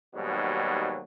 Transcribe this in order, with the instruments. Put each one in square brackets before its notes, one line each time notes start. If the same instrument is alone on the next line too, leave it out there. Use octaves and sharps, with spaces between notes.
[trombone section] D#2 G#2 B2 F#3 G3